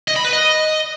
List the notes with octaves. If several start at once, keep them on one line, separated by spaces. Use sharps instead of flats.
D#5
B5
B4
D#5